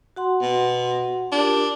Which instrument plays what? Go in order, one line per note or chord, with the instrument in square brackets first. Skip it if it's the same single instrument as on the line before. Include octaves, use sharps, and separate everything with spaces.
[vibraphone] F#4 F#5 C6
[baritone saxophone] B2
[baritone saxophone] D4 [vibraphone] F4 G4 A#4